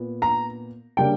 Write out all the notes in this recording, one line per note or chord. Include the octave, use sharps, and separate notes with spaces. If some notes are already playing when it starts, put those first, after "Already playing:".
Already playing: A#2 B3
A#5
C#3 G3 A#3 D4 G5